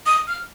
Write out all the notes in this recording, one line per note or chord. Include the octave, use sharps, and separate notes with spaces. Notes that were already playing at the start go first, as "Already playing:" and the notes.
D#6
F6